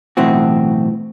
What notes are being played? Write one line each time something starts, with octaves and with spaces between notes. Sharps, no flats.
B1 A2 E3 C4 F#4